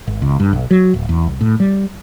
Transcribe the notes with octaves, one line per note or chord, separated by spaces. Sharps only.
G#1
C#2
G2
B1
F#3
D1
E2
C2
A2
G3